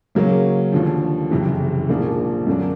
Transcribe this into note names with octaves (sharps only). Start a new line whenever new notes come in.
C#3 F#3 A#3 C#4
D#2 D3 F3
F#1 F2 C3 E3
A#1 G#2 F3 A#3 D4
F#2 D3 F#3 A#3 D4